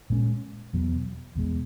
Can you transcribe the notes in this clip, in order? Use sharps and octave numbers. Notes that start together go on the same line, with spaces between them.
A#2 G#3 C#4
E2 B2 F#3
E2 B2 G#3